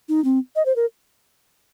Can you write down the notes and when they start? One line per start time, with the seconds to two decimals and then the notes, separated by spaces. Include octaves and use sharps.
0.09 D#4
0.25 C4
0.56 D#5
0.66 C5
0.76 A#4